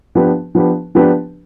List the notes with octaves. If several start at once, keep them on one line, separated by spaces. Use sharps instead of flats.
F3 B3 D4 G4 B4
F3 B3 D4 G4 B4
F3 B3 D4 G4 B4